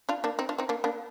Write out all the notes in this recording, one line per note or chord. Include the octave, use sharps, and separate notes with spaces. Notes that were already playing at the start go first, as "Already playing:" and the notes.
D4 F4
A#3 D4
C4 D#4
D4 F4
C4 D#4
A#3 D4
A#3 D4